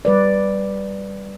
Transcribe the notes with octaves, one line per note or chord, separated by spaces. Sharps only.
G3 B4 D5